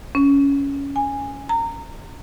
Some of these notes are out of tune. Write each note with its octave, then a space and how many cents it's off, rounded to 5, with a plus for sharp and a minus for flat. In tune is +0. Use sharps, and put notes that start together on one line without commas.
C#4 +10
G#5 -10
A#5 -20